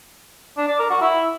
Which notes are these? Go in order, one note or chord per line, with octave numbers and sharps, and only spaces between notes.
D4
D5
A#4
F#4
E4